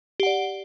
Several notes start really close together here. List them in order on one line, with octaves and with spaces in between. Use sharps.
G4 F#5 D5